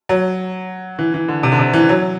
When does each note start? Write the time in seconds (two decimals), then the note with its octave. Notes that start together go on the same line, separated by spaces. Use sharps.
0.09 F#3
0.99 E3
1.14 E3
1.28 D3
1.43 C3
1.52 D3
1.59 C3
1.73 E3
1.89 F#3